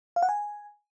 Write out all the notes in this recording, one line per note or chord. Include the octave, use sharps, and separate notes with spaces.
F5
F#5
G#5